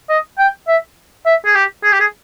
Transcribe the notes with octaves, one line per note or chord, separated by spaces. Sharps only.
D#5
G5
E5
E5
G#4
G4
G#4
G4
G#4